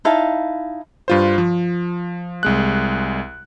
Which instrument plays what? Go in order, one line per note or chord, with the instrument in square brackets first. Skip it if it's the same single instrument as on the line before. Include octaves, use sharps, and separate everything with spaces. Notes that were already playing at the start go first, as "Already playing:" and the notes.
[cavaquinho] D#4 E4 F5 A5
[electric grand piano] G2 F4 C5
F3
C2 G#3 F#6